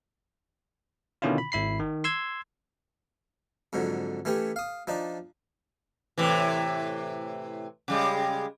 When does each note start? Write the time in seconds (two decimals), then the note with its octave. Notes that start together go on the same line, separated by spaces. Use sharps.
1.22 B2 D3 D#3 C#4 E4 F4
1.38 B5
1.52 G#1 E4 B5 C7
1.80 D#3
2.04 C6 E6 G#6
3.73 F2 G#2 D3 F#3
4.25 E3 A3 C#4 G4 C#5
4.56 F5 D#6
4.87 F3 D4 D#4 D5
6.18 A2 C3 E3
7.88 C#3 G3 G#3